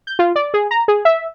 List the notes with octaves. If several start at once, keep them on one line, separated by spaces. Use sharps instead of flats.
G6
F4
D5
G#4
A#5
G#4
E5